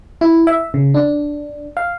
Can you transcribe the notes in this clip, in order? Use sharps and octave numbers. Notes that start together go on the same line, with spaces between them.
E4
E5
C#3
D4
F5